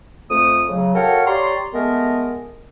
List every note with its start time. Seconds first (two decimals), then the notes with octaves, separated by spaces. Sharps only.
0.30 F2 A3 D#6
0.69 C#3 F#3
0.95 F#4 A4 A#4 C#5 F5 G5
1.26 G4 C#5 D5 A#5 C6
1.74 G#3 A3 B3 A#4